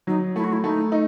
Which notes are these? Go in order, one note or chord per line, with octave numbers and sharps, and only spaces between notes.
F#3 D#4
A3 E4
F#4
E4
A3 D#4
D#4